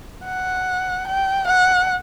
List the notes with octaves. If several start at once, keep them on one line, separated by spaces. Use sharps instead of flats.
F#5
G5
F#5